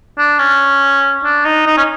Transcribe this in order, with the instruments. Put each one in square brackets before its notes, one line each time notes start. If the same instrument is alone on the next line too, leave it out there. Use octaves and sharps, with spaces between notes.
[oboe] D4
C#4
D4
D#4
D#4
C#4